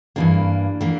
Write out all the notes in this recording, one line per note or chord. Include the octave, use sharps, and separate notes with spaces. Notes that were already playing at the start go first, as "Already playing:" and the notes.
G2 E3 A#3 D4
E3 A#3